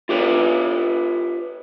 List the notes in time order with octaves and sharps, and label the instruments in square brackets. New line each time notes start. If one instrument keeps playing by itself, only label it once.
[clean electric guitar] F4 G4 B4 C#5